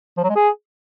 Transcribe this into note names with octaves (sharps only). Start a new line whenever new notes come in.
F3
F#3
G#3
G#4